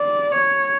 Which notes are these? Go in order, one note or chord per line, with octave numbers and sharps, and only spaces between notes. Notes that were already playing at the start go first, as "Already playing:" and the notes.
Already playing: D5
C#5